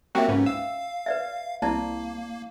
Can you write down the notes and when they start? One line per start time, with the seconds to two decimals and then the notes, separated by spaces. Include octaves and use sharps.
0.15 F#3 A#3 C4 F#4 G4 E5 G5
0.28 C#2 G#2 C#4 B4
0.46 F5 E6
1.06 B4 D5 E5
1.62 C2 A#3 E4 D5 A5